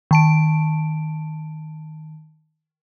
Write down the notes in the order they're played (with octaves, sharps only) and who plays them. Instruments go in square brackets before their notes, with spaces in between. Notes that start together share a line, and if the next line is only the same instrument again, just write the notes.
[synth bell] D#3 A5 D7